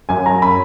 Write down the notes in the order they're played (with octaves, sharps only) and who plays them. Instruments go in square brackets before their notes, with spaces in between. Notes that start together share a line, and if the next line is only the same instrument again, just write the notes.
[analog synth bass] F#2 [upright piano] G#5
[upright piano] A#5
B5